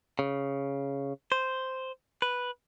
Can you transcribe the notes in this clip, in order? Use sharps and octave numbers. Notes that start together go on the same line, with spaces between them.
C#3
C5
B4